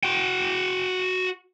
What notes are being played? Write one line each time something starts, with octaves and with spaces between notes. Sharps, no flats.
F#4 G5